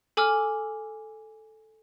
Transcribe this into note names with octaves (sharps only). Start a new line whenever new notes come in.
A4 G#5 D6 E6 F6